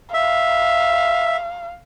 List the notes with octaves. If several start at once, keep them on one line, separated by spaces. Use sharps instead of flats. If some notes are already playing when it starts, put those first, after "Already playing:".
E5 F5